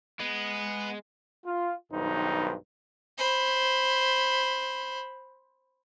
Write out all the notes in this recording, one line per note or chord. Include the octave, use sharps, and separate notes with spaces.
G#3 B3
F4
B1 G2 D#3 D#4 C5
C5 B5